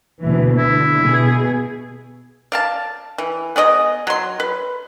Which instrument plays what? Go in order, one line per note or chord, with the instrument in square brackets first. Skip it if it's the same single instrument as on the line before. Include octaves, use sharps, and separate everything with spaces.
[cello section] D2 B2 E3
[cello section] D3 [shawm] E4
[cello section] B2 G#4
[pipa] D5 F5 A5
E3
B3 G#4 D5 D#5
F#3 C6
B4